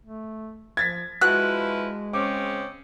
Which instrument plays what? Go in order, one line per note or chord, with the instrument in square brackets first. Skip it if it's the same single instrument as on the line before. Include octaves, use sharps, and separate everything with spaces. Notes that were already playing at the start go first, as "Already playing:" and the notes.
[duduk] A3
[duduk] F3 [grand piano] G#6 A6 B6
[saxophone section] F3 E4 B4 [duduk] G#3 [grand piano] F#4 [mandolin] F#6
[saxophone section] C#3 C4 C#4 [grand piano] D6